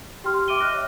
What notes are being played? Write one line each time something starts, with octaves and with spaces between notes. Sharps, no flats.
G4 G5 C6 F6
E5 D6 D7 D#7 G7
D#5 F6 F#6 A#6
C#5 E5